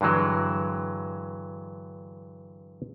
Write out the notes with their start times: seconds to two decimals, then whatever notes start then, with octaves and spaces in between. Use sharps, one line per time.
0.01 G2 D3 E3 F#3 G#3